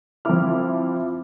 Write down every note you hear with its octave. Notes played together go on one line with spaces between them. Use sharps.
F3 C4 E4 D6 F6